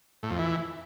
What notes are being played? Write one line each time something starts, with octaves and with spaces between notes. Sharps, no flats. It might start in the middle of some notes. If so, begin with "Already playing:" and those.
A2
F2
E3